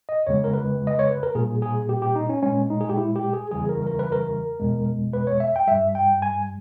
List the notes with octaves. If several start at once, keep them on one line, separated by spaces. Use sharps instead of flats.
D#5
E2 C#3 G#3 C#5
A#4
B4
D#5
C#5
B4
A#4
A#2 G3 G#4
G#4
G4
G4
D#4
C#4
A#2 G#3 C#4
D#4
G#4
G4
E4
G4
G#4
E2 C#3 E3 G3 G#4
A#4
A#4
B4
A#4
E2 B2 G#3
B4
C#5
E5
G5
G2 G3 E5
G5
G#5